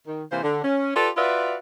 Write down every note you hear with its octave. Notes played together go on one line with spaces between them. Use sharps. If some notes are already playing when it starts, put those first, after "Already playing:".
D#3
C3 E3 A#3 C5
D3
C#4
F4 G4 A4 B4 D5
F4 F#4 B4 D5 E5 F5